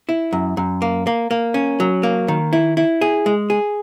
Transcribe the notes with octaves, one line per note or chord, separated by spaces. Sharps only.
E4
F#2
F#2
A#3
A#3
A#3
C#4
F#3
A#3
D#3
E4
E4
G#4
G#3
G#4